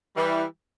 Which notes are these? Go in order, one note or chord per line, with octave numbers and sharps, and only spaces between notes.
E3 G3